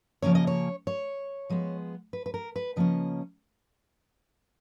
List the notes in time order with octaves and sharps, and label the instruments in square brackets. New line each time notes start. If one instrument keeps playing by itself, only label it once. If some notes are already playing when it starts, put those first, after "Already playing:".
[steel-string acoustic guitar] C#3 F3 A#3 C#4 C#5
D#5
C#5
C#5
F3 G#3 B3
B4
B4
A#4
B4
C#3 F3 A#3 C#4 D#5